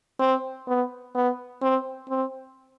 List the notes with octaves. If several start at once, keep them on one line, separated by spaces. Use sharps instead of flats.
C4
B3
B3
C4
C4